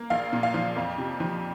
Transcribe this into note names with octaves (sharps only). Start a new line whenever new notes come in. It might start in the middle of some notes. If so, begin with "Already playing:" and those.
Already playing: A#3
A#1 F5
A#2
F5
F3
F2
C3
F3